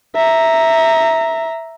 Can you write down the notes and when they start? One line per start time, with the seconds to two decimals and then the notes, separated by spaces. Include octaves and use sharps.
0.16 E5 A#5